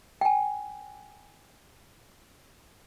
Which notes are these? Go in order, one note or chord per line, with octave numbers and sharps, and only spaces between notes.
G5 G#5